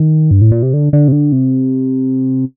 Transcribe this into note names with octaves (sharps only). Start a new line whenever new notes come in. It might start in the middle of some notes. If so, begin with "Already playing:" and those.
Already playing: D#3
G2
A2
A#2
C3
D3
D3
C3
D3
C3